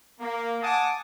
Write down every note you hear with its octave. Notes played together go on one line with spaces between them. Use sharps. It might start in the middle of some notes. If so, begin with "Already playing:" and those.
A#3
F#5 G#5 A5 D6 D#6